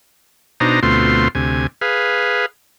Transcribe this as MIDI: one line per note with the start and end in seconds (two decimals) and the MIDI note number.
0.60 0.80 47
0.60 0.80 62
0.60 0.80 63
0.60 0.80 72
0.60 0.80 82
0.83 1.28 38
0.83 1.28 47
0.83 1.28 57
0.83 1.28 60
0.83 1.28 65
0.83 1.28 84
1.35 1.67 38
1.35 1.67 48
1.35 1.67 80
1.81 2.46 68
1.81 2.46 71
1.81 2.46 77